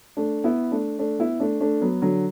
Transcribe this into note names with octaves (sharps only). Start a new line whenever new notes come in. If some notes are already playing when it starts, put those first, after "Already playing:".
A3 D4
B3 E4
A3 D4
A3 D4
B3 E4
A3 D4
A3 D4
F#3 B3
D3 F#3